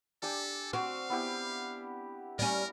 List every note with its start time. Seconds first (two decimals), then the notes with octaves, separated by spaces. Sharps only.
0.22 D4 G4 A4 G#5
0.73 C4 F#4 F5
1.10 B3 E4 G4
2.39 G3 C#4 A#4